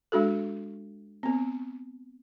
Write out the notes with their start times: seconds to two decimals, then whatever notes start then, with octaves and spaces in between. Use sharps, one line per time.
0.12 G#3 D4 F#4 A4
1.23 B3 C4